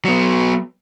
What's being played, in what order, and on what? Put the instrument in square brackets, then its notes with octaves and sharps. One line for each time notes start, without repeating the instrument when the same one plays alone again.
[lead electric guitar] F#3 B3